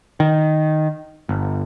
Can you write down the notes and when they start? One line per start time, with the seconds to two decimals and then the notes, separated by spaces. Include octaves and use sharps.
0.20 D#3
1.29 G1